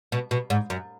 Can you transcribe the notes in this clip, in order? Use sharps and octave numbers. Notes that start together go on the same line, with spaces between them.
B2
B2
G#2
F#2